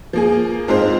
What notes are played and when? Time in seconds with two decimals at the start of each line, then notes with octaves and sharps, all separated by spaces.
0.13 F3 A#3 G#4
0.68 G#2 G#3 C4 F4 C5